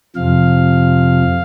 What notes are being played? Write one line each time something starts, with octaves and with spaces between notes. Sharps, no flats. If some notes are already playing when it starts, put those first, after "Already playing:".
F2 C3 F3 F5